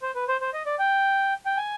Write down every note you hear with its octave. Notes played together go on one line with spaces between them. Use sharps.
C5
B4
C5
C5
D#5
D5
G5
G5
G#5